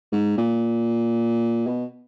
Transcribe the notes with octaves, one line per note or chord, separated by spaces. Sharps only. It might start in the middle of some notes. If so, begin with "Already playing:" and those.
G#2
A#2
B2